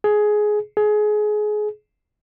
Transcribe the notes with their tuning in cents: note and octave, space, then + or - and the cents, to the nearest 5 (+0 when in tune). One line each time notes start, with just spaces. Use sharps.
G#4 +15
G#4 +25